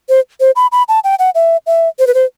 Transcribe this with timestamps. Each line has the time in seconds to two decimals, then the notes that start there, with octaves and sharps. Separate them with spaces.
0.09 C5
0.40 C5
0.56 B5
0.72 B5
0.88 A5
1.04 G5
1.19 F#5
1.35 E5
1.67 E5
1.99 C5
2.07 B4
2.14 C5